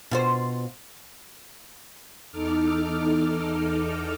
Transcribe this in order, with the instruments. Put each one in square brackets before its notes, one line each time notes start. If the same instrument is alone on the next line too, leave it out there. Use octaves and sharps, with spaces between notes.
[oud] B2 F4 C5
[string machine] E2 D#4 A4 D6 F6